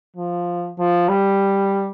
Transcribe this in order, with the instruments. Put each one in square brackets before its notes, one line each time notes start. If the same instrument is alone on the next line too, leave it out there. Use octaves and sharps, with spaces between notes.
[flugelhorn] F3
F3
G3